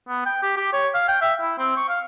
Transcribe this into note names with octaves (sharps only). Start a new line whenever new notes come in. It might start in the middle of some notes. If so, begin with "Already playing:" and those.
B3
G5
G4
G4
C#5
F5
G5
E5
E4
C4
C#6
F5